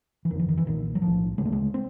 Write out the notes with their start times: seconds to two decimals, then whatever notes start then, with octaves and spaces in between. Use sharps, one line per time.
0.25 E3
0.30 G1 F2 D3 D#3
0.40 E3
0.49 D#3
0.57 E3
0.66 B1 A#2 D#3
0.95 F#3
1.02 B1 A2 F3
1.38 D2 C#3 G#3
1.45 A3
1.52 G#3
1.74 C4